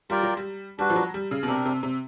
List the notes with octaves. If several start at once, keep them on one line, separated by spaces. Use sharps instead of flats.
G3 F4 A#4 D5 G5
F#3
G3
G3 D4 F#4 B4
F3
F#3
G3
C#3
B2
C3 D4 G4 A#4
C3
C3